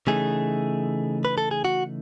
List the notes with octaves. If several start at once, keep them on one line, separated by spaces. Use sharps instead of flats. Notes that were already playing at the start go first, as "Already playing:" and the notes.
C#3 E3 A3 D#4 G#4
B4
A4
G#4
F#4